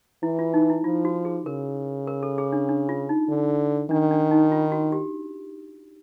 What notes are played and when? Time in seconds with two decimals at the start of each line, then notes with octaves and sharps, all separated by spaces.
0.23 E3 E4
0.39 F4
0.54 D#4
0.70 E4
0.84 F3 F4
1.05 F#4
1.25 G#4
1.46 C#3 A#4
2.07 A#4
2.23 A4
2.38 G#4
2.52 D4
2.69 D4
2.89 F4
3.09 D#4
3.29 D3
3.91 D#3 D4
4.11 D4
4.31 D#4
4.52 F4
4.72 F#4
4.92 G4